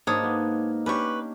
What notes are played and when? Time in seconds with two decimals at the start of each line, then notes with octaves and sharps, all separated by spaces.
0.07 G#2 A#3 D4 D#4 C#5 A5 D#6
0.23 B3
0.86 C#4 D4 G4 B4 C#6